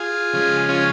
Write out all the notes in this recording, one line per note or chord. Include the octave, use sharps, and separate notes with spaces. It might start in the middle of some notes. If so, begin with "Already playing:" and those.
Already playing: F4 G#4
C#3 F3 G#3
C#4 F4